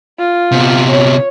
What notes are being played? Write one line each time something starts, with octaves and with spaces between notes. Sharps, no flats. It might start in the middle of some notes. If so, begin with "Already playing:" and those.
F4
C3 B3
C#5